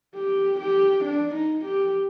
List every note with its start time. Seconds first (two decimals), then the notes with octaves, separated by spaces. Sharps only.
0.15 G4
0.60 G4
1.05 D4
1.35 D#4
1.65 G4